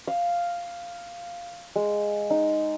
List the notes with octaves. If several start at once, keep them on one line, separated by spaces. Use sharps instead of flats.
F5
G#3
D#4